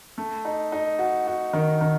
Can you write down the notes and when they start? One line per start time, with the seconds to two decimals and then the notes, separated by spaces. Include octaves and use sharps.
0.18 A3
0.45 D#4
0.72 D#4
0.99 F#4
1.27 F#4
1.53 D#3
1.81 D#3